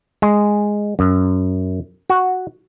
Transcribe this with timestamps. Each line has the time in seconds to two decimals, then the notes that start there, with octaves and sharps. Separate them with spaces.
0.22 G#3
0.99 F#2
2.10 F#4